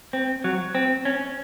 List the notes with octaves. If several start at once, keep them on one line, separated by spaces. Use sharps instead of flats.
C4
F#3
C4
C#4